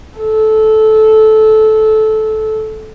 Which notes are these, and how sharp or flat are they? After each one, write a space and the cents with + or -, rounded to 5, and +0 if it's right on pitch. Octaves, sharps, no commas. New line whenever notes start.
A4 -15